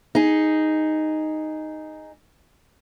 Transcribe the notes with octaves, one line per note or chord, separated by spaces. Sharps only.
D#4 G#4